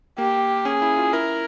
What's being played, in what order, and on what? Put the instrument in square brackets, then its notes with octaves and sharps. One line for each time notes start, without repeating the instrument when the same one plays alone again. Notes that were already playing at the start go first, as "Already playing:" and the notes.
[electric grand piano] A#3 [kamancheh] G4
[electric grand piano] C#4 [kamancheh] G#4
[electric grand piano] E4
F4
[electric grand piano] E4 [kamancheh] A#4